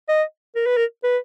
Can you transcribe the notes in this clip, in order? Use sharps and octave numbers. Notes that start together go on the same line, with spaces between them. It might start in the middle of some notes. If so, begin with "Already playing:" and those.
D#5
A#4
B4
A#4
B4